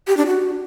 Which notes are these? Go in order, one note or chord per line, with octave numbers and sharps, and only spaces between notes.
G4
D4
F#4